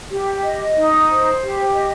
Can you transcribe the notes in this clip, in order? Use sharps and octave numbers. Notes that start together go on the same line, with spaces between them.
G4
D#5
D#4
C5
G4
D#5